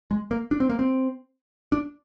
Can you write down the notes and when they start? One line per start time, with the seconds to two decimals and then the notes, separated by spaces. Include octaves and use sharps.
0.11 G#3
0.31 A#3
0.51 D4
0.60 C4
0.69 A#3
0.79 C4
1.72 D4